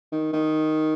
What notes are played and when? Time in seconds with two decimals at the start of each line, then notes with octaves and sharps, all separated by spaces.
0.12 D#3
0.33 D#3